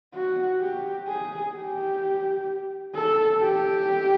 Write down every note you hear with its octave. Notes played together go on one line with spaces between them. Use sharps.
F#4
G4
G#4
G4
A4
G4